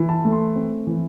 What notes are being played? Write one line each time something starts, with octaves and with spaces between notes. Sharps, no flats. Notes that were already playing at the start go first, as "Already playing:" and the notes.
Already playing: E3
A5
A3
C6
C4
E3